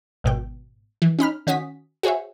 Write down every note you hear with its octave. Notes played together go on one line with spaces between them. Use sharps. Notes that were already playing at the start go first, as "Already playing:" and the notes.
G#1 B2 G5
E3
C#4 D#4 B5 F6
D#3 C#4 F#4 D#6 B6
F#4 G#4 C5 C#5 E5